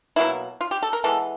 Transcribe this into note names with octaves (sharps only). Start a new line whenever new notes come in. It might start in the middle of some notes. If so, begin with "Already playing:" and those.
B2 F#3 A#3 E4
F4
G4
A4
A#4
E3 G#3 B3 A4